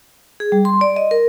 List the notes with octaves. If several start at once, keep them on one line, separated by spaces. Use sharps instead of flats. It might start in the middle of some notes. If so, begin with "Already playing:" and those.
G#4
G3
C6
D5
D#5
A#4